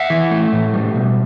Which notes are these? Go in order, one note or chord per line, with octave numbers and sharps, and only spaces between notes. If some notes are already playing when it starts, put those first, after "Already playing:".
Already playing: E5 F#5
E3
A3
A2
G3
B2